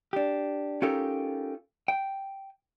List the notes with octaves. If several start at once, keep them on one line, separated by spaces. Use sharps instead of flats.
D4 G4
C#4 D#4 F4 G4 A4 A#4
G5